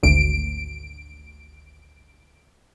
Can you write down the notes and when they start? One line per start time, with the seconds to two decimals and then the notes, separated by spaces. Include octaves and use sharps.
0.03 G#1 D2 D7